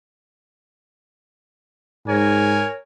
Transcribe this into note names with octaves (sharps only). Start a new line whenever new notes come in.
G#2 A#4 C#5 G#5